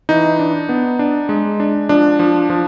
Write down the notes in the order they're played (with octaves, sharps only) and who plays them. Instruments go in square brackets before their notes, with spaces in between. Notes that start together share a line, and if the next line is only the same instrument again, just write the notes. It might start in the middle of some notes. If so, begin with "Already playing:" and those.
[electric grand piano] E3 D#4
D4
B3
D4
G#3
D4
F3 D4
F3
F3